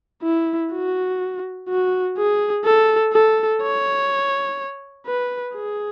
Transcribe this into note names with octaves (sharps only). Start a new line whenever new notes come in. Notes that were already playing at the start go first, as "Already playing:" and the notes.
E4
F#4
F#4
G#4
A4
A4
C#5
B4
G#4